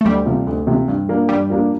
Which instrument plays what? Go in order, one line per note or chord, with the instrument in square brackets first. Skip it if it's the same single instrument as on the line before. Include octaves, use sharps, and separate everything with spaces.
[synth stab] A3
[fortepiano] D2 [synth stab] G3
[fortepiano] C3 F3
D2
C3 F3
G2
F3 A#3 D4
[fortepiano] G2 [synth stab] G3
[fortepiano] F3 A#3 D4